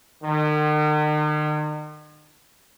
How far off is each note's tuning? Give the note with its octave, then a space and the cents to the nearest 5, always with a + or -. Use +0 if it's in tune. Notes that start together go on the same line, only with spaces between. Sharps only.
D#3 -45